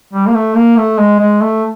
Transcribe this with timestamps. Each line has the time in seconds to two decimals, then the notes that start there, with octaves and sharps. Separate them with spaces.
0.13 G3
0.27 A#3
0.34 A3
0.55 A#3
0.77 A3
0.99 G#3
1.20 G#3
1.42 A3